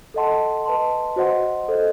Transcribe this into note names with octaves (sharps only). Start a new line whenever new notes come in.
A4 D#5 F#5 A5 C6
B4 D#5 A5 C6
F#4 C5 D#5 F#5 C6
A4 C5 D#5